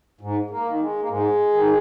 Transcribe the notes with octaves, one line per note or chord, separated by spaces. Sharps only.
G#2
A#3
D#3
G#3
A#3
G#2 G#3
D#3